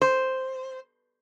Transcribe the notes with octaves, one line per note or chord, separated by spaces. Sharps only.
C5